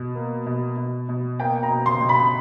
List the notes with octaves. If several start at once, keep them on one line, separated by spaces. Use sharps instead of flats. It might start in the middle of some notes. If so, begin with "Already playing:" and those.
Already playing: B2
A#3
B2
B2
B2
A#3 G5
A#5
B2
C6
B2
B5